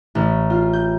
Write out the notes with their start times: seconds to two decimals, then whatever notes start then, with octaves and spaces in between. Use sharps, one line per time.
0.15 A1
0.50 F4
0.73 G6